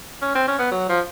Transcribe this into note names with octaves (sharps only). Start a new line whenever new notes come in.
C#4
C4
C#4
B3
F#3
F3